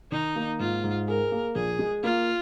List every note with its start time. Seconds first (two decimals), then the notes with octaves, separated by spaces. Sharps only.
0.12 D#3 D#4
0.36 A#3
0.60 G#2 F4
0.84 G#2
1.07 G#4 A#4
1.32 A#3
1.55 A#1 G#4
1.79 G#3
2.03 A#3 F4